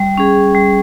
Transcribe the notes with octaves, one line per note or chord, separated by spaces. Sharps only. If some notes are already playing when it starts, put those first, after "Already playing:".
Already playing: G3
C#4 G#4
G3